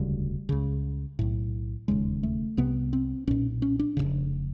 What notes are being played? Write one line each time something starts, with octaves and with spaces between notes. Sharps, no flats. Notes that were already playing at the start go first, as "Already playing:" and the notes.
Already playing: E1 D2 C#3 G3
C#2 C#3
B1 A2
E1 D#2 C#3 G#3
A3
C2 C3 B3
C4
B1 A#2 C#4
C#4
D4
F1 F2 C#3